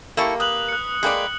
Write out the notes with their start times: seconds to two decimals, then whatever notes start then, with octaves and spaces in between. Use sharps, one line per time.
0.17 A#3 E4 G4 A4 C#6
0.40 B4 D#6 F#6 F#7
0.69 F#6 C#7
1.03 G#3 A#3 B4 D5 G5